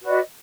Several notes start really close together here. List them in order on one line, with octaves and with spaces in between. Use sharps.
F#4 B4 D5 D#5